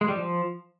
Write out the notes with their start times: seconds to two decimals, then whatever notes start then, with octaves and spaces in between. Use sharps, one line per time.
0.01 G#3
0.08 G3
0.16 F3